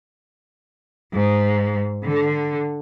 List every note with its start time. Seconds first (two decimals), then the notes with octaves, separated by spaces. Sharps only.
1.14 G#2
2.04 D3